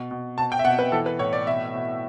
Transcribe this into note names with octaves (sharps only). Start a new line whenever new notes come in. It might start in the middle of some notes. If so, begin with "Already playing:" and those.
Already playing: B2
B2
B2 A5
G5
E5
B2 F#5
B4
E3 A4
B4
A2 C#5
D5
B2 E5
B2